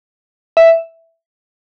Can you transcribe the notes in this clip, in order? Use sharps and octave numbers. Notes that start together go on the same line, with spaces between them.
E5